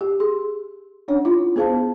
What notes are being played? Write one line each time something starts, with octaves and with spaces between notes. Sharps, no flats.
G4
G#4 C6
C#4 D4 C#5 F#5
E4 F4
B3 G#4 C5 F5 A5